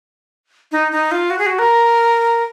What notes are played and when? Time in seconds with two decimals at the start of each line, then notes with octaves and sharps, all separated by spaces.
0.72 D#4
0.92 D#4
1.11 F4
1.30 F#4
1.39 G#4
1.46 F#4
1.59 A#4